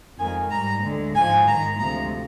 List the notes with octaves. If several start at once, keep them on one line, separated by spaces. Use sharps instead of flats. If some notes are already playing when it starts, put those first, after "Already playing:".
F2 D#3 G#3 G#5
G#2 G3 A#5
D2 D3 G#3
G#2 F3 G#3 G#5
G#2 D#3 G#3 A#5
D2 C3 F3 G#3 A#5